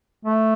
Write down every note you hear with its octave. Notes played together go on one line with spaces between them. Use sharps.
A3